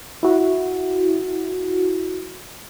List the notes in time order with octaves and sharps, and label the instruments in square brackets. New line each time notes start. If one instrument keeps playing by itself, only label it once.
[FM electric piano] E4 F#4